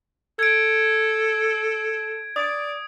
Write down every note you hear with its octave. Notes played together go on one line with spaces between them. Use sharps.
A4 G#6 D7
D5 D#6